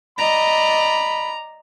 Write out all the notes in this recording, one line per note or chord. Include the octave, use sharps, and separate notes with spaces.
D5 D#5 A#5 B5